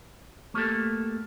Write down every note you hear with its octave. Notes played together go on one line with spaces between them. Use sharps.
A3 A#3 G4 A4